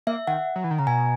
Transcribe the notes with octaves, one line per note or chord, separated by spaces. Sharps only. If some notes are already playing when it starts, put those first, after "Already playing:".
A#3 E5
D#3 F#5
F#3
E3
D#3
C#3 A#5
B2 G#5